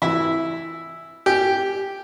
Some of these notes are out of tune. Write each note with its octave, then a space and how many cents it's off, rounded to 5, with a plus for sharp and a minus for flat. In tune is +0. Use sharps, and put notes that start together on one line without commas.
E3 +0 E4 +0
G4 +0 G#5 +0